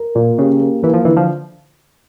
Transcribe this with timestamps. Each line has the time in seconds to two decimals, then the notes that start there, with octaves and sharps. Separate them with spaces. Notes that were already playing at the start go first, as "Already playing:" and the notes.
Already playing: A#4
0.15 A#2 A#3
0.38 C#3 G4
0.60 A#3
0.82 E3 A#3
0.94 F3
1.05 D3 E3
1.17 F3